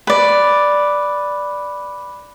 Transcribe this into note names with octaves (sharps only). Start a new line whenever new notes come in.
B4 D5